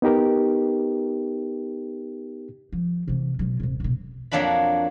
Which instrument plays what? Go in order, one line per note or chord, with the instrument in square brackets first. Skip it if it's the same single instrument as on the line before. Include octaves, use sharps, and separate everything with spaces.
[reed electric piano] B3 D#4 G4 A#4
[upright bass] F3
C3 E3
B2 F#3
D#1 C3
A1 B2
[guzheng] F2 F#3 A#3 D4 F#4 B5